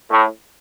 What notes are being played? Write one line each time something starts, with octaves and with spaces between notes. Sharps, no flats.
A2